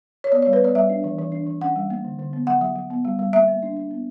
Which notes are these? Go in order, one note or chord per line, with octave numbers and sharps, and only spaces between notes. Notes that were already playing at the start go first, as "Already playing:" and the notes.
C#5
B3 D5
G3 C#5
B4
B3 D5
G3 E5
D4
E3
E3
D4
E3
C#4 F#5
G3
A#3
D3
D3
B3
F#3 F#5
F#3
F#3
B3
G3
G3
A#3 E5
A#3
D4
D4
B3